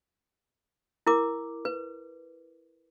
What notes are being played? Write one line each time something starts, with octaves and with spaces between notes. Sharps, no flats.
E4 A#4 D6
B4